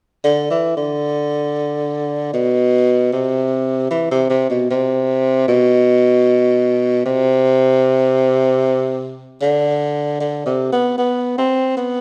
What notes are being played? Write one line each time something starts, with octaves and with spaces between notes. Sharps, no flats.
D3
E3
D3
B2
C3
E3
C3
C3
B2
C3
B2
C3
D3
D3
C3
B3
B3
C4
B3